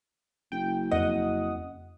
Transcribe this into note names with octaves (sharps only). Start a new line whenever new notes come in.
F#1 G5
F2 D#5 F#5 D#6